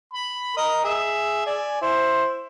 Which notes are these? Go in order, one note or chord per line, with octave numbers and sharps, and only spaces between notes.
B5
A#4 D#5
G#4 E5
D5 G#5
E4 C5